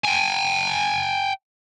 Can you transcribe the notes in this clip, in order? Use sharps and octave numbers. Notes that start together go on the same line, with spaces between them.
G5 G#5